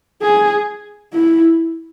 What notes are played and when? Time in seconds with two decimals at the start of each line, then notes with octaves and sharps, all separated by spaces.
0.22 G#4
1.13 E4